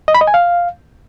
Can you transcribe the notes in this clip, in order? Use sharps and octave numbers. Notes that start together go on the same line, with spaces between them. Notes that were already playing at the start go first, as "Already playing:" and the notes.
D#5
B5
D#5
G#5
F5